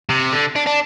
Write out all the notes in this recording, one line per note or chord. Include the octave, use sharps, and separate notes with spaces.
C3
D3
D4
D4